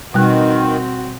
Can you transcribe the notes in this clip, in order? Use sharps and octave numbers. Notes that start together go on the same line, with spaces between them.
B2 D#3 G3 C4 F#4 F#6